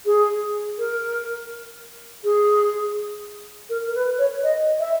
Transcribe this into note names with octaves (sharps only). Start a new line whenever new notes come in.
G#4
A#4
G#4
A#4
A#4
B4
C#5
D#5
E5